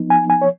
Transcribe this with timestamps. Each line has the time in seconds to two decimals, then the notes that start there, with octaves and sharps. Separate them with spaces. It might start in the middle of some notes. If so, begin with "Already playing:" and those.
Already playing: F3 B3 D#4
0.10 G#5
0.30 G#5
0.42 C#5